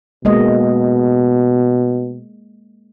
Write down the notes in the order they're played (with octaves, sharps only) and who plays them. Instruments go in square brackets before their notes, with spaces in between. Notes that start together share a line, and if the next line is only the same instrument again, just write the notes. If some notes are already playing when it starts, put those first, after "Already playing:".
[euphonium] B2 [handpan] G#3 A#3 D#5